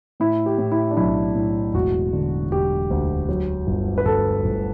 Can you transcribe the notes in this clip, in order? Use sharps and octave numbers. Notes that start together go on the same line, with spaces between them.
A2 E4
G4
A2
E4
D4
B1 E4
A2
E1 F#4
D3
E1 G4
D2
F#3
G1
B4
G1 A4
G1